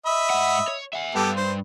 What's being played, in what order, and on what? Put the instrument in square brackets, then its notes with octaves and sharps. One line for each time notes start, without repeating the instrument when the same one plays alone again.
[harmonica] D#5 E5 B5
[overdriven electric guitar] G#2 F#5
C#5
E5 F#5
[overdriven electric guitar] G2 [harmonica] B3 G4 A4
[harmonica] C5